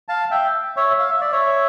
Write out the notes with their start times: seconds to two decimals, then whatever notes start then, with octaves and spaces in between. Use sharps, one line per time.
0.08 F5 A5
0.31 E5 G5
0.77 C#5 E5
0.99 F5
1.10 E5
1.21 D5
1.32 C#5 E5